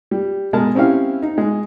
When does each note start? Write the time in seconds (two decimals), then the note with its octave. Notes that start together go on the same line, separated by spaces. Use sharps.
0.11 G3
0.53 B2 G#3 A#4 A5
0.75 C4 C#4 E4 G4 F5
1.23 D#4
1.38 G#3